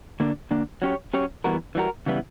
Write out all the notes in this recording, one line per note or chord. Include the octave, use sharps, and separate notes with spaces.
D3 A#3 D4
D3 A#3 D4
F#3 C#4 G4 C#5
F#3 C#4 G4 C#5
E3 G3 B3 F#4 A#4
E3 G3 B3 F#4 A#4
C#3 E3 G3 B3 E4